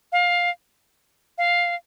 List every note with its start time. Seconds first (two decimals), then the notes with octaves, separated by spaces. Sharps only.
0.12 F5
1.38 F5